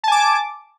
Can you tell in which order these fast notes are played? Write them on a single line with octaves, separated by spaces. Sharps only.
A5 G#5 D6